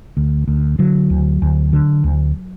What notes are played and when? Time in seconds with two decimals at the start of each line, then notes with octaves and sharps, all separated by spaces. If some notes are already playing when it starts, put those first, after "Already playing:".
0.17 D2
0.48 D2
0.79 D3 F#3
1.10 D2
1.42 D2
1.73 D3
2.04 D2